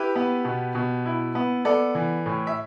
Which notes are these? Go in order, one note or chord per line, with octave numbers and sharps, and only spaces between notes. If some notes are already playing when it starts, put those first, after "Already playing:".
Already playing: E4 G4 B4
B3
B2
B2
E4
B3
B3 A4 D5
E3
A2
E5